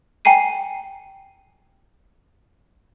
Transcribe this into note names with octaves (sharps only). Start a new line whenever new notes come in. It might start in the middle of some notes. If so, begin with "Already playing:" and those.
G5 G#5 A#5 C7 D#7